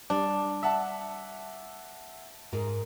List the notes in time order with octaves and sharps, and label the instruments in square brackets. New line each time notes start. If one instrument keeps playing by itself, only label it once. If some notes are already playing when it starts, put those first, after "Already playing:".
[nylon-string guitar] G3 [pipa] D4
[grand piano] E5 F#5 A5
[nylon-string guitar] G#2 G#3 A#4